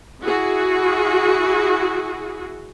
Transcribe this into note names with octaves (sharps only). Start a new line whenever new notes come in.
E4 F#4 G#4